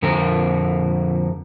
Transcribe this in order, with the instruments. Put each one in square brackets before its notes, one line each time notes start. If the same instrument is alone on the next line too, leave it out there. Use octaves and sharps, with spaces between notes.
[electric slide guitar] F2 D3 A#4